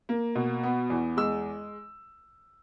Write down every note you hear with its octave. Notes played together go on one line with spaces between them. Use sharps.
A#3
B2
B3
E2
G#3 E6